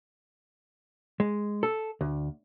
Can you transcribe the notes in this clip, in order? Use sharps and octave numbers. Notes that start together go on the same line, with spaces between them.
G#3
A4
D2